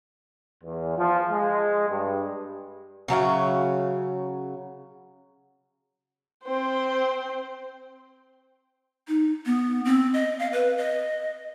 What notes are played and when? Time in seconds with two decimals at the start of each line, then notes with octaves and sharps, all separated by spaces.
0.64 E2
0.98 F3
1.31 G#3
1.90 G2
3.08 C#3 F#3 E5 F5
6.44 C4 C5
9.08 D#4
9.46 B3
9.85 C4
10.14 D#5
10.39 F5
10.53 B4
10.77 D#5